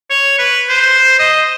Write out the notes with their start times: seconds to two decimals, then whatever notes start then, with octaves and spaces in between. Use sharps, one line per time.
0.10 C#5
0.38 B4
0.69 C5
1.19 D#5